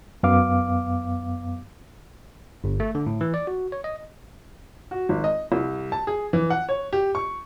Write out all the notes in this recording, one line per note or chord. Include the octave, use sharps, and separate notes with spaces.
F#2 B3 F5 D6
G1
A3
D3
A2
E3
D5
F#4
C#5
D#5
F#4
G#1
D#5
C2
A5
G#4
E3
F#5
C#5
G4
C#6